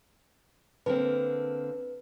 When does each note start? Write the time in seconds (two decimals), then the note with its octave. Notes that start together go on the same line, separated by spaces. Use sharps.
0.86 D3 A#3 C4 B4